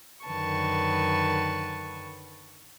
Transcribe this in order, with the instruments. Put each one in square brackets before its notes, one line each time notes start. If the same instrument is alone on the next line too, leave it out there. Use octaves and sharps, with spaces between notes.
[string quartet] F#2 D3 D#3 B4 A5 C#6